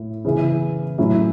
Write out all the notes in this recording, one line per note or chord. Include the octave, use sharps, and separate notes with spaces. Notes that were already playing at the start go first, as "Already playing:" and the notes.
Already playing: A2 A3
C#3 E3 C#4 E4
A2 F#3 C#4 E4